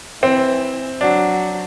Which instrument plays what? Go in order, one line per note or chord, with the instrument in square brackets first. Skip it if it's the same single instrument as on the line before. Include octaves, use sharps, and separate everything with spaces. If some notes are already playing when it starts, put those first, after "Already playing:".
[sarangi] E3 [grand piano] C4
[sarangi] F#3 [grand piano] D4